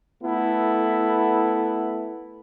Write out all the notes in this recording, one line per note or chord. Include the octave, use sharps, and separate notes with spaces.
A3 B3 E4 A4